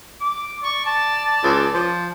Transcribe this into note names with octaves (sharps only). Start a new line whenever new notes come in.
D6
D5 C#6
A5
C#2
F3